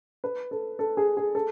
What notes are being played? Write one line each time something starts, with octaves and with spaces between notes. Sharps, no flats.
B4
A4
A4
G#4
G#4
A4